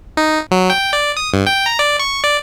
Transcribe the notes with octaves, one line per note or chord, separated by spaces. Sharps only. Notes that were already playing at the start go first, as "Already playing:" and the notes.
D#4
F#3
G5
D5
D#6
G2
G5
A#5
D5
C#6
D5